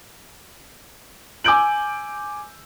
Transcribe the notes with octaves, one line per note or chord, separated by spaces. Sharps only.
G#5 D6 E6 G6 D7 F#7